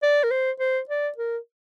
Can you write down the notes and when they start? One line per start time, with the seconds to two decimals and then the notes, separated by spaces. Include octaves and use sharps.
0.03 D5
0.24 A#4
0.31 C5
0.60 C5
0.89 D5
1.18 A#4